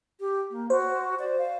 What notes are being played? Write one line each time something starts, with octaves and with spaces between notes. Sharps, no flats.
G4
A#3
F#4 C5
D5
F5